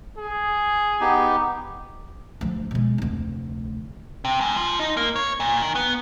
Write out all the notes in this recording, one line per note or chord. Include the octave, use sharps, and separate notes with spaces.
G#4
B3 D#4 G4
D2 F3
B2 G#3
F1 D2
C3
G#2
F3
D#4
A#3
C#5
A#2
D#3
B3